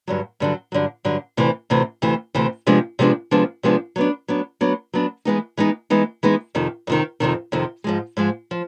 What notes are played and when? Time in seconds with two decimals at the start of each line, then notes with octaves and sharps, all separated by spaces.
0.07 G2 D3 F#3
0.40 G2 D3 F#3
0.72 G2 D3 F#3
1.05 G2 D3 F#3
1.37 D2 C3 E3
1.70 D2 C3 E3
2.02 D2 C3 E3
2.35 D2 C3 E3
2.67 C3 F3 G#3 B3 D4
2.99 C3 F3 G#3 B3 D4
3.31 C3 F3 G#3 B3 D4
3.63 C3 F3 G#3 B3 D4
3.96 F#3 B3 D4
4.28 F#3 B3 D4
4.61 F#3 B3 D4
4.93 F#3 B3 D4
5.25 E3 G#3 B3 D#4
5.57 E3 G#3 B3 D#4
5.90 E3 G#3 B3 D#4
6.23 E3 G#3 B3 D#4
6.55 F2 C3 D#3
6.87 F2 C3 D#3
7.20 F2 C3 D#3
7.52 F2 C3 D#3
7.84 G#2 F3 G#3
8.17 G#2 F3 G#3
8.51 F3